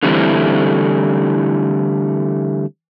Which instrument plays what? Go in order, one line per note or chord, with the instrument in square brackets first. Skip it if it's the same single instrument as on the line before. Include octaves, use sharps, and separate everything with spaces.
[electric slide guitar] D3 E3 G3 A3 C4 E4